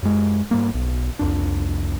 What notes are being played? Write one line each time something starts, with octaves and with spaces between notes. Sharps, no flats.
F#2 G#3
G#2 G3 A#3
B1
C2 F2 D4